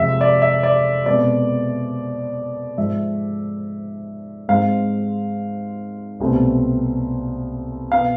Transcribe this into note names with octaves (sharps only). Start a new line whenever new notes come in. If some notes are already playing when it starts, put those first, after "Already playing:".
Already playing: F2 C3 F3 G#3 E5
D5
E5
D5
B2 G#3 C4 D5
G#2 F3 G#3 E5
G#2 G#3 C4 F5
C2 B2 A3 C4
B2 B3 F5